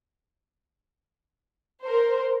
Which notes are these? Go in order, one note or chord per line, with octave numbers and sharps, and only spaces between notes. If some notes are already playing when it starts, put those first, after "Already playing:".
A#4 C5